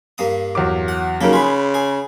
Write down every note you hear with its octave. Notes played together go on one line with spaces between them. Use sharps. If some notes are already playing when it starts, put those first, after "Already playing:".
G2 A#3 D#6
E2 F#3 D6
F#5
C#3 F#3 A#3 D#4 G4 A4 A#4
G#4 B4 B5 C6
G#4